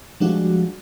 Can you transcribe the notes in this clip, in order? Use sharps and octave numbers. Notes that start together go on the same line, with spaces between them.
F3 G3 G#3 D4 F#4